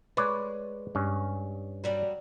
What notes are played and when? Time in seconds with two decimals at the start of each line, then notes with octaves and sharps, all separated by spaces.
0.17 G#3 B4 C#5 D5
0.95 G2 C#4
1.84 F#3 G3 D4